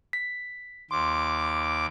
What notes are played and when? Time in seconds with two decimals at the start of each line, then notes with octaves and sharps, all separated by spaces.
0.13 B6
0.91 D#2 C6 D6